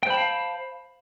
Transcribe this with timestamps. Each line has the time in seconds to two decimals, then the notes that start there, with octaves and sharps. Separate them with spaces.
0.03 G5
0.07 C5
0.10 B5
0.14 A5
0.17 F5